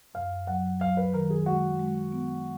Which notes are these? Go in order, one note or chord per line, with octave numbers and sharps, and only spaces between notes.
F#2 F5
F#3 F#5
F#3 F5
B4
D#3 A#4
G#4
G#3 F#4
G#3
B3